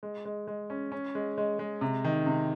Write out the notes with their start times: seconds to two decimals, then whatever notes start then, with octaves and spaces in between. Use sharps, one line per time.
0.03 G#3
0.25 G#3
0.47 G#3
0.70 C#4
0.92 C#4
1.15 G#3
1.38 G#3
1.59 G#3
1.81 C3
2.04 D#3
2.26 C3